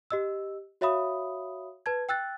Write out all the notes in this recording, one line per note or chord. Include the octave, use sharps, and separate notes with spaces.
G4 D#5 E6
F#4 C#5 E5 F5 B5 D#6
B4 A5 G#6
G5 E6 F#6 A6